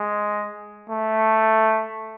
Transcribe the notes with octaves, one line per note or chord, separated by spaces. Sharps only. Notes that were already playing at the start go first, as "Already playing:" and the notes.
Already playing: G#3
A3